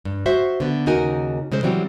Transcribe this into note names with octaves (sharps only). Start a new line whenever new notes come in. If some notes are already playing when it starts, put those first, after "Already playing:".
G2
F#4 C5 E5
D3 B3
D#2 C#3 D#4 F#4 A#4 G#5
C#3 G#3 A4 C5
E3 F#3 G3 C4